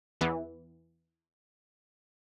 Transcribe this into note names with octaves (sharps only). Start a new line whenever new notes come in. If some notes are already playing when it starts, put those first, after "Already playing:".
E2 E3 B3